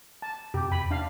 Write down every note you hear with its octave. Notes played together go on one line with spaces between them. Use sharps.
A5
F2 C3 G4
E2 B5
D4 F5